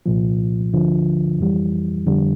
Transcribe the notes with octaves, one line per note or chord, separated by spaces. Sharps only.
C2 A#2 F3
D2 D3 F3
F2 E3 G3
F2 D3 G3